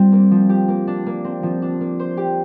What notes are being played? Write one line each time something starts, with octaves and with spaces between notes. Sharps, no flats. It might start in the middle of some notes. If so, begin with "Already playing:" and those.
Already playing: G3 C4 F4 G4
A#3
F3
G4
A#3
D4
A#3
C4
F3
D4
A#3
C5
G4